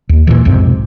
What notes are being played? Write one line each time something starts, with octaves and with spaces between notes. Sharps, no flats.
D#2
A#2 C#3 E3
B1 F2 G#2 C3